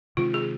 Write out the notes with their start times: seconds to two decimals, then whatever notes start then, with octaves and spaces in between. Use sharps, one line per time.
0.17 C3 D#3 G#3 C4 F4
0.34 G#4